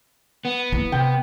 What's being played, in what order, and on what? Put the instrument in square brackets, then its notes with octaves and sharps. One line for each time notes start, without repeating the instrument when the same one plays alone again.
[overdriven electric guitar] B3
[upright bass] A#3 E4
[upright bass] C3 [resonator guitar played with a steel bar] G5